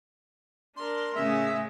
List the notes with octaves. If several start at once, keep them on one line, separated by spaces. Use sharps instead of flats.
D4 A#4 C6
A2 C#3 G#3 C#4 E5